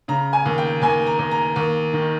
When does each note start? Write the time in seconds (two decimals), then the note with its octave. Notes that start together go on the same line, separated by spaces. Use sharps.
0.08 C#3 A#5
0.33 G#5
0.45 D#2
0.58 G5
0.82 D#2 G#5
1.07 A#5
1.19 D#2
1.31 A#5
1.56 D#2
1.93 D#3